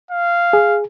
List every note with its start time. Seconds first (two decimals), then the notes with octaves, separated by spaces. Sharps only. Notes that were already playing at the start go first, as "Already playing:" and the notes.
0.11 F5
0.53 G#4